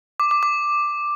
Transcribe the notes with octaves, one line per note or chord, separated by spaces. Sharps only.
D6
D6
D6